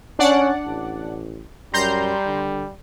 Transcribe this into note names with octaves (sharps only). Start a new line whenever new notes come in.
C#4 D4 D5 F#5
A1
F#2 G3 A#5 C6 G6
D3